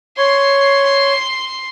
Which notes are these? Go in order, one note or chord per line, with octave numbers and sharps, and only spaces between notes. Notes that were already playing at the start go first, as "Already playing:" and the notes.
C#5 C6 C7